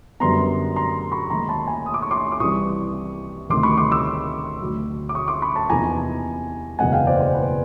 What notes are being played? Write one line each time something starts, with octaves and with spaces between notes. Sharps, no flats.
F#2 D3 G3 B3 A#5 C6
A#5 C6
B5 C#6
D#2 D#3 G#3 A#5 C6
A5 B5
G#5 A#5
D#6
D6
C#6
C6 D6
D6
C2 C3 E3 G3 C#6 D#6
D2 C3 D#3 C6 D6
B5 C#6
C6 D6
D6 E6
D2 D3 F#3
D6
C#6 D#6
C6 D6
B5 C#6
A5 B5
E2 C3 F3 A#3 D#4 G#5 A#5
F#1 E2 B2 G#3 F#5 G#5
F5 G5
C5 D5
C5
B4